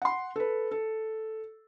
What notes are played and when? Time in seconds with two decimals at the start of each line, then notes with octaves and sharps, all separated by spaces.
0.02 F#5 C6
0.36 A4 B4
0.71 A4